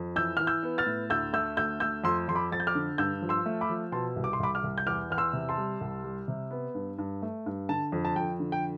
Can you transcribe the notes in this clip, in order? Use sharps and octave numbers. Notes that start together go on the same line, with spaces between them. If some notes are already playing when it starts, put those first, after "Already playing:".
Already playing: F2
E3 E6 G6
E3 F6
E6 G6
B3
F6 A6
A2
D2 E6 G6
A3 E6 G6
D2 E6 G6
A3 E6 G6
F2 C6 E6
F2 C6
B5 D6
F2 A6
G6
D6 F6
D3
G2 E6 G6
F3
C6 E6
A3
B5 D6
F3
B2 A5 C6
C2
D6
C6
C2 B5 D6
D6 F6
C2
G6
E2 D6 F6
E2 F6
C6 E6
C3
A5 C6
G3
C2
G3
C3
B3
G2
G2
A3
G2
D3 A5
F2
A5
F2 G5
D3
G5